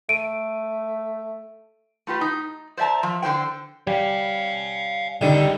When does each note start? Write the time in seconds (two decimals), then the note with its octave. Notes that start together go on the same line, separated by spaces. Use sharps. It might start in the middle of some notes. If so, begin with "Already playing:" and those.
0.09 A3 D7 D#7
2.07 A3 F4 G4 B4
2.21 D#4
2.77 C5 D5 E5 A5 A#5
3.03 F3 E5
3.22 D3 G4 C5 G5
3.87 G3 C#5 F5
5.21 C#2 D3 D#3 G3 A4